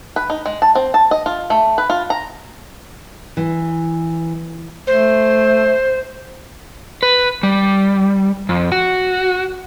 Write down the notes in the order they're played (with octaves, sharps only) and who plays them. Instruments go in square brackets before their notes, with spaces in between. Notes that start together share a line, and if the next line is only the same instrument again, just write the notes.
[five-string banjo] B4
D#4
G#3
A5
C4
A5
D#5
F4
A3
B4
F4
A#5
[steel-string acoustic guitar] E3
[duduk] A3 [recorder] C5
[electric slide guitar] B4
G3
F2
F#4